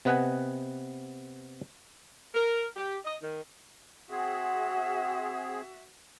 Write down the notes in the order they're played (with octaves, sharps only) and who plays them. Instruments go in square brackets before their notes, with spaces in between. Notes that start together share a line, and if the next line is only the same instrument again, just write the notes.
[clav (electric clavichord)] C3 B3 B4 D#5 F#5 G#5
[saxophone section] A#4
G4
D#5
D#3
[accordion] C4 G#4 [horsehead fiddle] F#4 E5 [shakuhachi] F#5